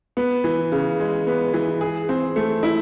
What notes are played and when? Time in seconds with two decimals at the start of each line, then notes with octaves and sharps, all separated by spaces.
0.17 B3
0.44 E3
0.72 C#3
1.00 G#3
1.27 B3
1.54 E3
1.81 G#4
2.09 C4
2.36 A3
2.63 E4